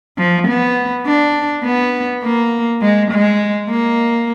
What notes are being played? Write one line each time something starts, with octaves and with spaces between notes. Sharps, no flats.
F3
B3
D4
B3
A#3
G#3
G#3
A#3